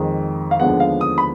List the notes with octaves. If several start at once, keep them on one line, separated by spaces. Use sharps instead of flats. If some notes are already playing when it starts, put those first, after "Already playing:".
Already playing: F2 D#3 G#3
F5
D#2 D3 F3 G#3 B3 F#5
F5
D#6
B5